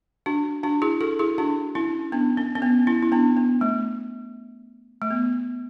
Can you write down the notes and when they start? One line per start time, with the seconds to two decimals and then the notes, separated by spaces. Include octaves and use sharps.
0.26 D4 F#4
0.63 D4 F#4
0.82 E4 G#4
1.01 F#4 A4
1.19 E4 G#4
1.38 D4 F#4
1.75 C#4 E4
2.12 B3 D4
2.37 C#4
2.55 C#4
2.62 B3
2.87 C#4 E4
3.02 E4
3.12 B3 D4
3.37 B3
3.61 A3
5.02 A3
5.11 B3